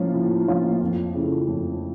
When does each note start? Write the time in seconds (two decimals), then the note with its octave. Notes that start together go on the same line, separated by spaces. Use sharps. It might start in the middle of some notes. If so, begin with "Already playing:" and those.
Already playing: A2 F3 A#3 C#4 F4
0.13 A2
0.47 F3 A#3 C#4 F4
0.81 F2
1.14 C#3 E3 A3
1.48 F2